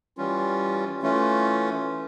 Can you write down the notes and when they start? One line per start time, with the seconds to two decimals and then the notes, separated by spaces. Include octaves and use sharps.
0.17 E3 G3 C#4 F4
1.02 E3 A3 C#4 F4